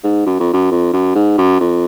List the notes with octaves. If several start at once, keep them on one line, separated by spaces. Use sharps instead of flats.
G#2
F#2
F2
F#2
F2
F#2
G#2
F#2
F2